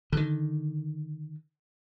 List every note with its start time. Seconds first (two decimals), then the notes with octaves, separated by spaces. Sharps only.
0.13 D3 D#3